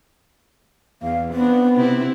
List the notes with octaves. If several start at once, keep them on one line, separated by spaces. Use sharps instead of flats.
E2 F5
B3 C4 D4
C3 C4 E4